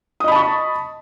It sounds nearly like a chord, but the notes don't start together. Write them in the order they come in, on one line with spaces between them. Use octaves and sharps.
D#6 D#5 B5 A5 C#6